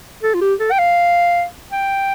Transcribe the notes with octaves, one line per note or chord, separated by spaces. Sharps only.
A4
F4
G4
A4
G5
F5
G5